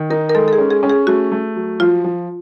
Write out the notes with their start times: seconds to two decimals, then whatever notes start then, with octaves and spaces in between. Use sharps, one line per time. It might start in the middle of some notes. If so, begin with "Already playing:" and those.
Already playing: D#3
0.10 D#4 A#4
0.30 A#4
0.35 G#3 A4
0.48 A4
0.53 G#4
0.58 C#4
0.71 G#4
0.83 C#4
0.90 G#4
1.07 A3 F#4
1.32 A3
1.56 F#3
1.80 F3 F4
2.04 F3